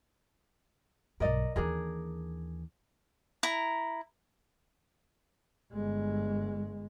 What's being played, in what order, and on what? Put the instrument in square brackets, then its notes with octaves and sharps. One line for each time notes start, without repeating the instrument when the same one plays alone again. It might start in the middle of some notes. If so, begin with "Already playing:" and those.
[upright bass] B1 G2 [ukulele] A#4 D5 D#5
[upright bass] D#2 E3 [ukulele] D4 G#4 A#4
[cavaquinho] E4 A#5
[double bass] G1 G#3